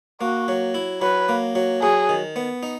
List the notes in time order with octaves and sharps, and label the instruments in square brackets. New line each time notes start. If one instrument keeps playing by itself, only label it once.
[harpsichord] A#3 [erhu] F#4
[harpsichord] F#3
E4
[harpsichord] F#3 [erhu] B4
[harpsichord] A#3
F#3
[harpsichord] F#3 [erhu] G#4
[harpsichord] D#3
B3
D#4